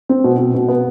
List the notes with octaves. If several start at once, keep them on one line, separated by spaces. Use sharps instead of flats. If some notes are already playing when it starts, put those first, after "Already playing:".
C4
B2
B2
B2
B3